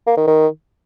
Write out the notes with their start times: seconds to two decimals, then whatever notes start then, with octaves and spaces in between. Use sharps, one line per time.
0.07 A#3
0.17 D#3
0.27 D#3